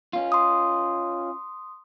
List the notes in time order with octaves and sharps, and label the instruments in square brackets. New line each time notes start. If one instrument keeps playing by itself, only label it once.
[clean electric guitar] C#4 F4
[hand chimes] C6 D#6